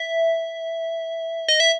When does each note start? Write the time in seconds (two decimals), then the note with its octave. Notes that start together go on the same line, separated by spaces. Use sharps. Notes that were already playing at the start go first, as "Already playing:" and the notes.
Already playing: E5
1.48 D#5
1.60 E5